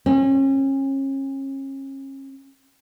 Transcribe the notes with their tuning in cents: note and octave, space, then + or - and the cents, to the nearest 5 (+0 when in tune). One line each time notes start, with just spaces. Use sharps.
C#4 -35